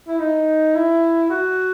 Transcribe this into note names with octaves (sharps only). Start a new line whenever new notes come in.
E4
D#4
E4
F#4